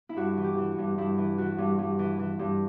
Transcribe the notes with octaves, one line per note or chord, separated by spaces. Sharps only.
E4
G2 F#4
E3
G4
E3
F#4
G2
G2 E4
E3
E3 F#4
G2
G2
E3
E3
G2